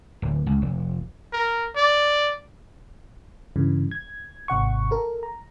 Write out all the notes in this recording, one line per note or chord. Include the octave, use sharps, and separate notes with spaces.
D1
C#2
F1
A#4
D5
G2 C#3 E3
G#6
G#1 C3 F#5 C#6
A4 A#4
A#5